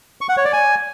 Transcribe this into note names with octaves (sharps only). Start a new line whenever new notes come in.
C#6
F#5
C#5
D5
G#5